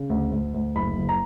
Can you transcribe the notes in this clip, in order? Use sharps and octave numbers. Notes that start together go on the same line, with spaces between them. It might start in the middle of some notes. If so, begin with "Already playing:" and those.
Already playing: C#3
D2
D2
D2
F#1 B5
F#1
A#5